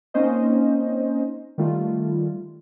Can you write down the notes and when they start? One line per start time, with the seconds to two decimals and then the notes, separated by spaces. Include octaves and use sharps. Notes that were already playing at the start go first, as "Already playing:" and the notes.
0.14 A#3 C4 C#4 D#4 C5 D#5
1.58 D#3 G3 A3 F4